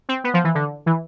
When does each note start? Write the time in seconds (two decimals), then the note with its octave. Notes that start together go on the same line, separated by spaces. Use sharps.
0.09 C4
0.24 B3
0.34 F3
0.44 E3
0.55 D3
0.86 E3